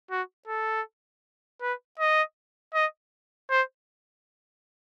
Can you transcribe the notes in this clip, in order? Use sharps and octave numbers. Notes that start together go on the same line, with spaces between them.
F#4
A4
B4
D#5
D#5
C5